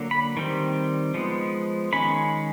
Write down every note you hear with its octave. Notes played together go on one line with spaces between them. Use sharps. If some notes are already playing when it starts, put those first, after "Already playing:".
Already playing: D3 F#3 A#3
B5
D#3 G3 C4
F3 G#3 B3
D#3 G#3 C#4 B5